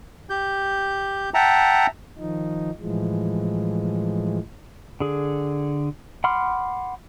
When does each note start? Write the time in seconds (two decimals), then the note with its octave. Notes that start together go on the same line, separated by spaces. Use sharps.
0.30 G4 G6
1.34 E5 F#5 G5 A5 A#5
2.18 D#3 F3 D#4
2.80 A2 E3 F3 G#3
5.00 D3 G#4
6.24 F#5 B5 C6 D6 F6